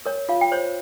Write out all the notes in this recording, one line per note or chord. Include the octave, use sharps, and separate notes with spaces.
A#4 C#5
F4 F5
G5
C5 C#5